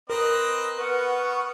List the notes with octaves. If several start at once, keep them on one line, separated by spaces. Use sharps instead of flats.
C4 A#4 B4 D#5
B3 B4 F#5 C#6 F6